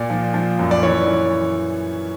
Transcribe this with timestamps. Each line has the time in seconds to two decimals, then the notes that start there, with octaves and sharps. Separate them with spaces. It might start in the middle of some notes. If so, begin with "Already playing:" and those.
Already playing: A#2 D5
0.10 F3
0.34 F3
0.59 F#2
0.71 D5
0.83 E3 C#5
1.07 E3